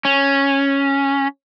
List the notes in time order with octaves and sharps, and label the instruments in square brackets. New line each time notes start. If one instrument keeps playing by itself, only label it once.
[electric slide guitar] C#4